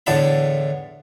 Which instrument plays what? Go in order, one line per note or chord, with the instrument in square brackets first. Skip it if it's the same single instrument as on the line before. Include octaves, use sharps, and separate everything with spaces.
[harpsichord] E2 A2 D3 A4 E5 B5